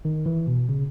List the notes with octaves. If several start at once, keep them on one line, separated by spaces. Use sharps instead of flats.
D#3
E3
B2
C#3